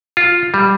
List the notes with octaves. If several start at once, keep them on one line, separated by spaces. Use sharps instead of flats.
F4
G3